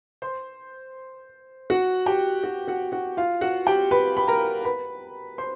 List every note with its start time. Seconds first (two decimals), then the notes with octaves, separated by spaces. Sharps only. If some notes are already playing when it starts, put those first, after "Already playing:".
0.22 C5 C6
1.70 F#4 F#5
2.06 G4 G5
2.43 F#4 F#5
2.68 F#4 F#5
2.92 F#4 F#5
3.17 F4 F5
3.41 F#4 F#5
3.67 G4 G5
3.91 B4 B5
4.17 B5
4.28 A#4 A#5
4.65 B4 B5
5.38 C5 C6